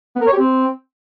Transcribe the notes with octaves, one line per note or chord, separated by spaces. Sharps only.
B3
A#4
C#5
G4
C4